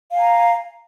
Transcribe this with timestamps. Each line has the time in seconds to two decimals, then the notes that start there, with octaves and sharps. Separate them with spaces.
0.10 F5
0.15 G#5
0.19 A#5